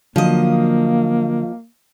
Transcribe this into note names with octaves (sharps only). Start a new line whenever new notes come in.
D3 F3 F#3 A#3 D#5